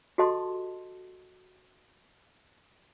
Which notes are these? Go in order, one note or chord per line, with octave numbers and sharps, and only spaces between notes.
F#4 G4 A4 D#5 A5 C6